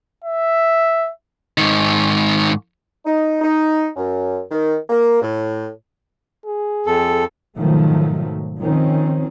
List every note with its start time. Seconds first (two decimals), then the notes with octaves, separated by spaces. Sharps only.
0.24 E5
1.58 G#2 D#3
3.06 D#4
3.41 D#4
3.96 F#2
4.51 D#3
4.90 A#3
5.22 A2
6.46 G#4
6.86 F2 A4
7.58 G#2 B2 D#3 F3 F#3 A3
8.59 D#3 F3 C4 C#4